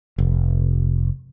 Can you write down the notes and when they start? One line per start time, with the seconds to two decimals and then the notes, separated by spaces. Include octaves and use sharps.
0.18 F1